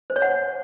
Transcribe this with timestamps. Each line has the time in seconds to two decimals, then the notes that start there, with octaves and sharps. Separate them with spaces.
0.10 C5
0.16 C#5
0.22 F#5